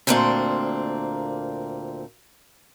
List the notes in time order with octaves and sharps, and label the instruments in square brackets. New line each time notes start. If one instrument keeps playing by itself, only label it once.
[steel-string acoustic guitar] D2 A#2 A#3 C4 D4